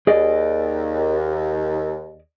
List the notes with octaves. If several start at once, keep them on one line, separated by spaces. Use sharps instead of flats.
D#2 G#4 D5 D#5